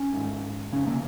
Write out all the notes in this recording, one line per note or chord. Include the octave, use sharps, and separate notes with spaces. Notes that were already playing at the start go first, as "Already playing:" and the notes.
Already playing: C#4
G#1 G#2
F1 D#2 C#3 C#4
A#3